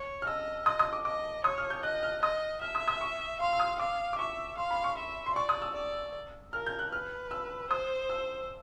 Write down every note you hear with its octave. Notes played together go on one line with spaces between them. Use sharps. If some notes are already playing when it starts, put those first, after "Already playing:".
Already playing: C#5
F6
D#5 E6
D#5 D#6
D#6
D6
D#5 D6
C#5 D#6
F6
G6
D#5 F#6
F6
D#5 D#6
E5 F6
D#6
D#6
C#6
F5 C6
E6
D#6
F5 D6
D6
E5 C#6
F5 C6
B5
C#6
E5
C6
D5 C#6
D#6
E6
D5
A#4 F6
G6
F#6
B4 F6
E6
C5 D#6
E6